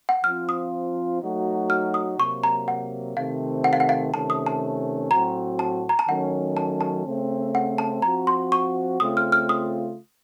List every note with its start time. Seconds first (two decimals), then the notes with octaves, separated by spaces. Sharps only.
0.09 F#5
0.24 F3 C4 F4 F6
0.49 D#6
1.22 F#3 A3 D#4 F#4
1.70 F6
1.94 D#6
2.18 C3 F#3 A#3 C#6
2.44 A#5
2.68 F#5
3.16 C3 D#3 A3 C4 F5
3.64 F#5
3.73 F5
3.80 F#5
3.89 F5
4.14 C3 D#3 A3 C#4 A5
4.30 D#6
4.46 A5
5.11 A2 F#3 C4 F#4 A#5
5.59 A5
5.89 A#5
5.99 A5
6.08 D#3 F#3 A3 C#4 F#5
6.57 A5
6.81 A5
7.06 C#3 A3 C4
7.55 F#5
7.78 A5
8.02 F3 C4 F#4 A#5
8.27 C6
8.52 C#6
9.00 C#3 A3 C4 F4 D#6
9.17 F6
9.32 F6
9.49 D#6